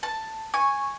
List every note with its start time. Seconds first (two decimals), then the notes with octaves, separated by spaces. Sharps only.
0.03 A5
0.54 G#5 C#6